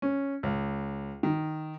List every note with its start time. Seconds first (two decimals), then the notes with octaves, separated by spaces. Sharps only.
0.02 C#4
0.43 C#2
1.23 D#3